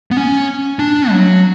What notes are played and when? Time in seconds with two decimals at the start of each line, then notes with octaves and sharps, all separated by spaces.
0.11 B3
0.17 C#4
0.79 D4
1.11 F#3